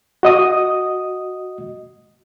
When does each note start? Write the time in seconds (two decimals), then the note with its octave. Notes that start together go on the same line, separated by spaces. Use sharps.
0.23 F#4 D#5 D#6